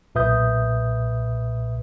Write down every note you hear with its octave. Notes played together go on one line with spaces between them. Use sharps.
B1 A#2 B4 E5 D#6 G6